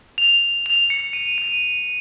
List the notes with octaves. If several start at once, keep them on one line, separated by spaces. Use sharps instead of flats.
F7
F7
C#7
D#7
D#7